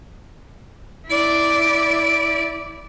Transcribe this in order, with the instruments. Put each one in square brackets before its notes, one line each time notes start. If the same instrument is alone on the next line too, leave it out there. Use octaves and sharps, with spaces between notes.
[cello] E4 D5